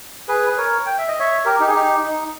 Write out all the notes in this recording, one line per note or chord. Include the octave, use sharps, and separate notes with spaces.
G#4 B4
B4
A#4 C#5
G5
E5
D#5
C#5 E5
G4 A#4
D#4 G4
G#4
D#4 G4
D#4